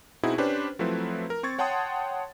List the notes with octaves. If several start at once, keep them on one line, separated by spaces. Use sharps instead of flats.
B2 C4 D#4 E4 F#4 G#4
C#4 D4 G4 B4 C5
F3 F#3 A3 C4 E4 B4
A#4
C4 C#6 G#6 A6
C#5 F#5 G5 A5 C6 D#6